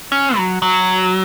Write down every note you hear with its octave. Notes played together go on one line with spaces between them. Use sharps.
C#4
F#3
F#3